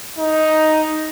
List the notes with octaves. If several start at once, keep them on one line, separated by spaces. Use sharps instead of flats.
D#4